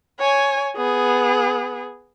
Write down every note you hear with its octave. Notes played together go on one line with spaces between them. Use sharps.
C#5 G#5
B3 G#4